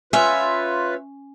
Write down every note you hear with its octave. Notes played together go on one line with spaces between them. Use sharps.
C#4 F4 B4 C#5 E5